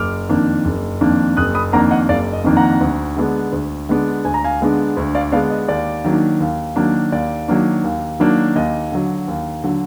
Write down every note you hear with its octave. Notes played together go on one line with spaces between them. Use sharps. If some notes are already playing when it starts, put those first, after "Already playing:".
Already playing: F#1 D6 F6
F2 D#3 A#3 D4
F#1
F2 D#3 A#3 D4
F#1 D#6 F#6
B5 D#6
F2 D#3 A#3 D4 F#5 A#5
D#5 F#5
F#1 D5 F5
D#5
F2 D#3 A#3 D4
F#5 A#5
D2
D3 G#3 B3 D4
D2
D3 G#3 B3 D4
D2 G#5
A#5
F5 G#5
D3 G#3 B3 D4
D2
D5 F5
D3 G#3 B3 D4 D5 F5
D#5
D#2 D5
D#3 F#3 A#3 D4
D#2
D#3 F#3 A#3 D4
D#2 D5
D#3 F#3 A#3 D4
D#2
D#3 F#3 A#3 D4
D#2 D#5
D3 F#3
D#2
D3 F#3